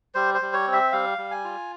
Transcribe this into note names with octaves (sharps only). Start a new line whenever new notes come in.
G3 C5
C5
G3
C#5
C4
E5
G3 F5
G3
G#5
F4